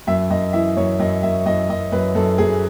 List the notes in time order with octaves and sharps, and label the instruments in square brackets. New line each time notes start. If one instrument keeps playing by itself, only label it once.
[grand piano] F#2 E5
F#2 D#5
E3 E5
F#2 C#5
F#2 D#5
F#2 E5
F#2 D#5
F#2 D#5
F#2 B4
F#2 A4
F#2 G#4